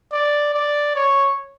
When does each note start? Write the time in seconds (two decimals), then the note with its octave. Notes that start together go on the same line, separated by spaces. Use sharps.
0.13 D5
0.54 D5
0.95 C#5